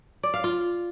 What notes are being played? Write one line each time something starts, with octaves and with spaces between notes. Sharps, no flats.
D5
F5
F4